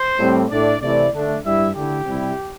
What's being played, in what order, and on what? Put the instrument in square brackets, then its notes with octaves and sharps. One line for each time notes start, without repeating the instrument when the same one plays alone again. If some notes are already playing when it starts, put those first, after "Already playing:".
Already playing: [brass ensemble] C5
A2 G3 C4
A2 A3 D4 D5
C3 E3 A3 C4 E4 D5
D3 A3 D4
G2 G3 E4 E5
D3 A3 E4 G4
C3 G3 E4